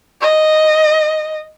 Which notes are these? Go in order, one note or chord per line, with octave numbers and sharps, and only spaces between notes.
D#5